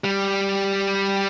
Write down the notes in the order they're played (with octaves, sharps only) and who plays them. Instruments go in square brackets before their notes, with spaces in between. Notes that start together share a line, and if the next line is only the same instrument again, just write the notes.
[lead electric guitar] G3